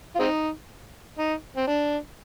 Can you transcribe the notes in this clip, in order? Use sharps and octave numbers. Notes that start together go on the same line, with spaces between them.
F4
G#3 C4 D#4
D#4
C4
D4